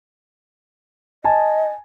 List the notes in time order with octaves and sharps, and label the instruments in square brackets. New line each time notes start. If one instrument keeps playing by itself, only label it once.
[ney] D#5 [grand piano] G#5 A5